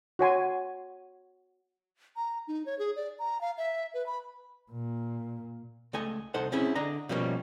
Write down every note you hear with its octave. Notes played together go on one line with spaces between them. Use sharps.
F#4 C#5 G#5 C6
A#5
D#4
C#5
G#4
D5
A#5
F5
E5
B4
B5
A#2
C#2 A3 A4 D#5 G#5
C2 D#4 A4 C5 F#5
C4 C#4 E4 G#4
D3 D4 D#5 A#5
B2 F3 G3 A#3 C#4